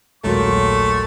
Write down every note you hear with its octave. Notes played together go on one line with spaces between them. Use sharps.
A#1 D#2 A#2 F#3 G#3 A3 C#6